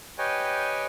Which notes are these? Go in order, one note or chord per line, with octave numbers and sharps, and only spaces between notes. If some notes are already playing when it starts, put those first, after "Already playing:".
G4 B4 C#5 D#5 G5 G#5